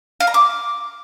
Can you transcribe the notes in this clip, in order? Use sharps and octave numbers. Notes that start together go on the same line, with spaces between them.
F5
A#5
D6